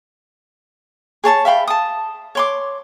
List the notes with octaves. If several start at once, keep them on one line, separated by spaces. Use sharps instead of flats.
G#4 C#5 A5 C#6
E5 F5 G5 B5
A5 D#6
C#5 C6 D6